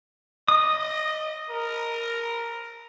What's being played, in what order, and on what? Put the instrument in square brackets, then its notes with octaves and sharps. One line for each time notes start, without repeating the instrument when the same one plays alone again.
[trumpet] D#5 [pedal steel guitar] D#6
[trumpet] A#4